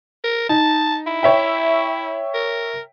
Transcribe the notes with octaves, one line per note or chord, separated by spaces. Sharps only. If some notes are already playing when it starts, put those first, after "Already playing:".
A#4
D#4 A5
E4
C#5 E5 G5
A#4